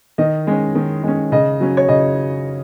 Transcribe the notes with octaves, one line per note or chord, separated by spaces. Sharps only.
D#3 D#5
G#3 C#4
D#3
G#3 C#4
C#3 D#5
F#3 C#4
C#5
C#3 D#5